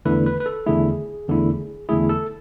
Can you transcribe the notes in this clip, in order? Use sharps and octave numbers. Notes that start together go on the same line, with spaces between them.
E2 D3 A3 E4 B4
B4
B4
A4
E2 D3 A3 E4 G#4
E2 D3 A3 E4
E2 D3 A3 E4 G#4
A4